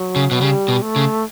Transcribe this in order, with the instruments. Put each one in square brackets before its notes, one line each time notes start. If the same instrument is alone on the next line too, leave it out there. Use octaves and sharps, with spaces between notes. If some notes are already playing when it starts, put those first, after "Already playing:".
Already playing: [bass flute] F#3
[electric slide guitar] C#3
B2
[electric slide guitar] C#3 [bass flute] G3
[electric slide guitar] B2
[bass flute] A3
[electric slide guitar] C#3